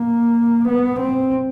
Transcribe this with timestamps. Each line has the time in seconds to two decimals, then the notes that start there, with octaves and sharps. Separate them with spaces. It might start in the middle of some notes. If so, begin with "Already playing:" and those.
Already playing: A#3
0.68 B3
1.00 C4